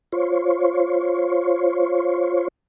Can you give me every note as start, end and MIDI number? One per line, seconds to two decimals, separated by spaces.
0.12 2.48 65
0.12 2.48 72
0.12 2.48 73